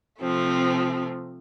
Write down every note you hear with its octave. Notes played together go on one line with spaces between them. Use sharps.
C3 F3 A3 C4